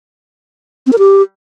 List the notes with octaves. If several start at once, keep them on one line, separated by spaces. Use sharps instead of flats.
C4
A#4
G4